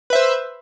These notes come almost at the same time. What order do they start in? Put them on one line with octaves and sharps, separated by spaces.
B4 E5 C5